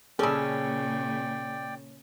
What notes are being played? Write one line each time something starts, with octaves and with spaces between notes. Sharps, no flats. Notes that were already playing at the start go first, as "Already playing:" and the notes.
A#2 C#3 G3 C#4 G#4 A4 D5 G5